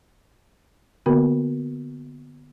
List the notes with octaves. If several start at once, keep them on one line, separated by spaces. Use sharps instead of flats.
D3 A#3 B3 F#4 A#4